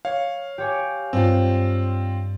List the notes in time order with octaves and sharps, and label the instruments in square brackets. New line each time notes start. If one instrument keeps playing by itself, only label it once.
[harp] C#5 [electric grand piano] F5
[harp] G4 C#5 G#5
[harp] G2 [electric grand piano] C4 F4